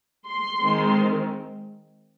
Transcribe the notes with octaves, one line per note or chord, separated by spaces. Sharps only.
C6
D#3 G#3 C4